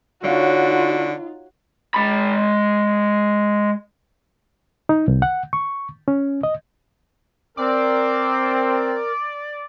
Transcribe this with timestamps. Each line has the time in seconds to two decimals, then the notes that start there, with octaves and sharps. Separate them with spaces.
0.24 D3 D#4 F4 F#4 C#5 F5
1.94 G#3 B5
4.89 D#4
5.08 C2
5.22 F#5
5.53 C#6
6.08 C#4
6.43 D#5
7.57 C4 A#4 D5